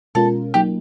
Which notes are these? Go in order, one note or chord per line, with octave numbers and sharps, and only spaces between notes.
B2 G#3 C#4 F4 A4 A#4
F#3 A#3 D#4 G4